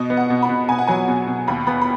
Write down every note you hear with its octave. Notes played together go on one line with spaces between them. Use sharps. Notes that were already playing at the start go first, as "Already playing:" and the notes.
Already playing: B2 D#5
B3
F#5
B2
B5
B2
B2 G#5
F#5
F#3 G#5
B2
B2
D#2 B5
B3 B5
B5